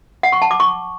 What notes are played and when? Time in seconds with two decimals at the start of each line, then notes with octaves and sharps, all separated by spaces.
0.23 F#5
0.32 C#6
0.42 A5
0.51 D6
0.60 C#6